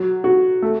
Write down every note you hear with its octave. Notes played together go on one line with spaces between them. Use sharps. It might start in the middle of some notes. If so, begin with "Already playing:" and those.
Already playing: F#3
F#4
A3